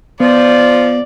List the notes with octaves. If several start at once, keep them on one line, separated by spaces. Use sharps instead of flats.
F3 B3 D5